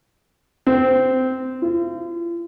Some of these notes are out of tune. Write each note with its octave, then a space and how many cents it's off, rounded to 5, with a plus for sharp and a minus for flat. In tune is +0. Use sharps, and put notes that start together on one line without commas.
C4 -15
F4 -45